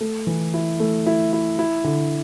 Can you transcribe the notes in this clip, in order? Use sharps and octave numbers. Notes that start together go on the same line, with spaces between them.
A3
E3
E4
A3
E4
E4
E4
D3